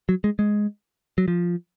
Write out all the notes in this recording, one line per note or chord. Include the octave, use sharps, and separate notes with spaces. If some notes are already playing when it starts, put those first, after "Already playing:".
F#3
G#3
G#3
F#3
F3